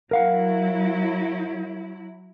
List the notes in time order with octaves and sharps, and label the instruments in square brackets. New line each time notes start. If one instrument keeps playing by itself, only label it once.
[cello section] F#3 E4 [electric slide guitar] A#4 F5 F#5